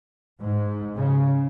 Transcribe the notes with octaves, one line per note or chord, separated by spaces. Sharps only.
G#2
C#3